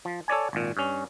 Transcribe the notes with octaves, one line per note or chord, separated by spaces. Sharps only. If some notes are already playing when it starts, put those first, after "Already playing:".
F3
A4 C#5 D5 G#5
G#1 A#2
G2 C#4